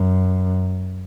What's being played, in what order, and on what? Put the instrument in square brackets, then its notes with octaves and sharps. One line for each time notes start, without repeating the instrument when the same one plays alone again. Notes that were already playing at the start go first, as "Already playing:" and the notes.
Already playing: [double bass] F#2